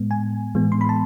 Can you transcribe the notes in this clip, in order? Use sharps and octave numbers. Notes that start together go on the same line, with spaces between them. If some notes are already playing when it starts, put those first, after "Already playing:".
Already playing: A2 G#3 B3
G#5
A2 E3 G#3 B3
C6
B5
A5